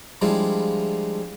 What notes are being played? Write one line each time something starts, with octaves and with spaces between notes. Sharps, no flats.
F3 G3 G#3 D4 E4 F4